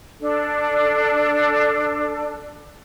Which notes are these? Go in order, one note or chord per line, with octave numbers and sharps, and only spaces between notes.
D4 A4